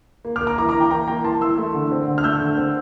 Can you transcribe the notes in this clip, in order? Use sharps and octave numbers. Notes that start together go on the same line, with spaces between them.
A#3
D6 F6
A#3
A#5 D6
E3 A#5 D6
A#5 D6
E3
G5 A#5
A#3 G5 A#5
A#3 G5 A#5
E3 A5 C6
E3 C6 E6
A3
D3
C4
D3
F6
A3 E6 G6
D3
C4